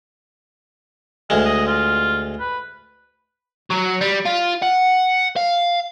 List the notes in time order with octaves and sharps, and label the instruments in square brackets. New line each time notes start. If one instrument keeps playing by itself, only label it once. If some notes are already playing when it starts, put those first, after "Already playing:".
[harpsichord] D2 G#3 [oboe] F5
[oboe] D#5
F4
B4
[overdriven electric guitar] F#3
G3
F4
F#5
F5